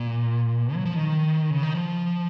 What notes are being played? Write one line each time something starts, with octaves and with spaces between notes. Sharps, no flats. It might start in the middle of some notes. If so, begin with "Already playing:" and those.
Already playing: A#2
F#3
F3
D#3
C#3
D#3
F3